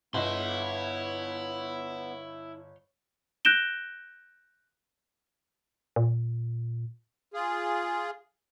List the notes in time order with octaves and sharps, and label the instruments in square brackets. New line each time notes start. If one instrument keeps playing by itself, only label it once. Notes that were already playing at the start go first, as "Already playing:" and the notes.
[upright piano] G1 D#5 [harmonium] B3 [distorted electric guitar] E4 [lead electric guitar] C#5 C6
[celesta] F#6 G6 A#6 D7 E7 G7
[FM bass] A#2
[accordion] F4 G#4